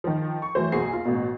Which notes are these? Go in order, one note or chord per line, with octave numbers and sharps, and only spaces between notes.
D#3 F3
C#6
E3 F#3 A3 C5
F#1 B1 F#4 G#4 G#5 C7
F4
A1 B2